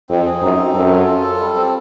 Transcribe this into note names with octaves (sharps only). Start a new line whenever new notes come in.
F2 C4
G#4
F#2 D#4
C4
F#2 A4
F4
F4
A4
G3
C4